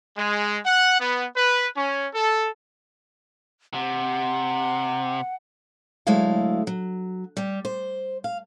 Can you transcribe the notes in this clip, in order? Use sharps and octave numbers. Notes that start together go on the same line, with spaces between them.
G#3
F#5
B3
B4
C#4
A4
C3 F#5
D2 F#3 G#3 A3 E4 F5
F#3
G3 G4
C5
F5